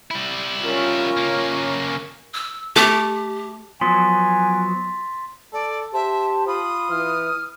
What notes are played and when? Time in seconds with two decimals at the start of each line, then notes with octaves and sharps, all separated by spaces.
0.11 G3 E4
0.64 C#4 F4 A#4
1.17 C#3 A#3
2.34 E6
2.76 A3 G4 D6
3.81 F3 F#3 B3 G#5 C6 A6 B6
5.53 A4 D5
5.94 G4 C5 E5 A5
6.47 F4 B5 D#6
6.90 E3 F6